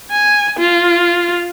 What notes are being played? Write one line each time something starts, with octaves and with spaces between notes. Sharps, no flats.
G#5
F4